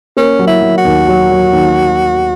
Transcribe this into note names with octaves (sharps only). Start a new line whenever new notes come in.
A#3 C#4
F#3
E4
F#3
F#4
D#2
F#3
F#3
D#2